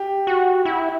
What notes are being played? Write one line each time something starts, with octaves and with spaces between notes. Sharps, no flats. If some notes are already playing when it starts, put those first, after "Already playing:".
Already playing: G4
F#4
E4